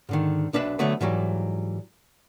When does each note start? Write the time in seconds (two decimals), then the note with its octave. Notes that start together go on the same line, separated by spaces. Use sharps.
0.09 G#2 D3 D#3
0.53 B1 D4 B4 E5
0.79 D3 F#3 A3 B3
1.01 G#2 E3 F#3 G3